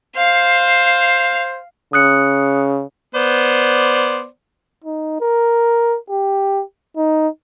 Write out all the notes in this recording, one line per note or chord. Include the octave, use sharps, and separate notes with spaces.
C5 F5
C#3 D#6 F#6 C#7
B3 C5 D5
D#4
A#4
G4
D#4